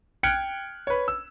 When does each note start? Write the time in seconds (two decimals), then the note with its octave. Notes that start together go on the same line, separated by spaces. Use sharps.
0.23 G5 F6 F#6 G#6 C#7 D7
0.87 B4 C#5
1.08 E6